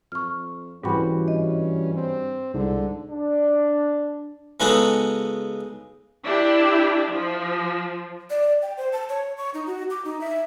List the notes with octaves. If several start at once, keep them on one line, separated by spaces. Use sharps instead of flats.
F2 C#6 F6
C2 G#2 E3 C#4 F#4 G4 G5 B5
G2 D#5
C4
C2 G#2 D3
D4
C#3 G#3 B3 D#4 F#4 A4
D4 E4 G4
F3
D5
G5
C5
A5
C#5
C#6
D#4
F#4
D6
D#4
E5